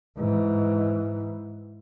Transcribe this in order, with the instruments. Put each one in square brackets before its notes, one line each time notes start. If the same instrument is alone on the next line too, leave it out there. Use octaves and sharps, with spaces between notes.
[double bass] G#2 E3